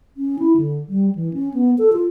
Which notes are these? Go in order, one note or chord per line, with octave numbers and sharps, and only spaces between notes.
C#4
E4
D3
G3
E3
C#4
B3
A4
F4